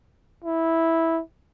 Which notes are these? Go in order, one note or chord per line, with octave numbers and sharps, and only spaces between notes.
E4